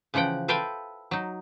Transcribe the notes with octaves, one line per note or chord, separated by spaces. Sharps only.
C#3 E3 F3 F#5 G5
A4 B4 C5 E5 F5 G5
F#3 D#4